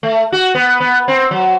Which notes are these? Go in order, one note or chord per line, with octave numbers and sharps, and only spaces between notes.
A3
F#4
B3
B3
C4
F#3